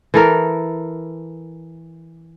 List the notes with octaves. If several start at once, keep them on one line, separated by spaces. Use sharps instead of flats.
E3 A4 A#4